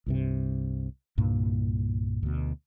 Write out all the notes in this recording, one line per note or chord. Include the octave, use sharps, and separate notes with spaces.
C2 G2 C3
C2 G2 A#2 A#3
D2 B2